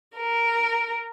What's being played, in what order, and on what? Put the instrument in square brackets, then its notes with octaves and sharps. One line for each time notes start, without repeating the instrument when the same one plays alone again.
[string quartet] A#4